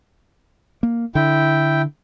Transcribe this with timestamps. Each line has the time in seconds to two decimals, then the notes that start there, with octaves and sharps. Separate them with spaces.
0.83 A#3
1.15 D3 E4 G5